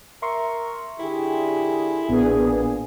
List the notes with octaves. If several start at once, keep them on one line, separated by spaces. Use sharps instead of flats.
A#4 E5 C6 C#6
D3 E4 G4 G#4
A1 A#2 B3 D4 G#4